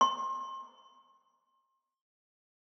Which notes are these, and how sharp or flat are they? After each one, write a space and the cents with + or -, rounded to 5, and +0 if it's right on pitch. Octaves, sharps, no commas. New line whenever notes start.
C6 +35